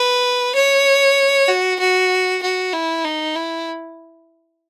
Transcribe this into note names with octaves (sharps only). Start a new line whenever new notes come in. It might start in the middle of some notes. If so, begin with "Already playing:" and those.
Already playing: B4
C#5
F#4
F#4
F#4
E4
D#4
E4